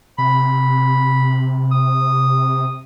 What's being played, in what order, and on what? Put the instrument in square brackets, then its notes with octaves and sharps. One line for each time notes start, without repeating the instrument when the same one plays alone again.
[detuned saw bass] C3 [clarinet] B5
[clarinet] D#6